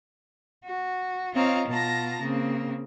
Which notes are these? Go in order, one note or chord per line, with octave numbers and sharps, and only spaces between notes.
F#4
C4 F4 C#5 D#5 F5 A#5
B2 F4 A5 A#5 A#6
C#3 A#3 C4